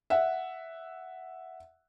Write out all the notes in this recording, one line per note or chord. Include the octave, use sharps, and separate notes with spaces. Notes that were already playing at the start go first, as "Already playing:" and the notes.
E5 F#5